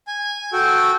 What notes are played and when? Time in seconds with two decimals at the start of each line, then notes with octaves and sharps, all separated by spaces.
0.07 G#5
0.53 F#4 A4 G5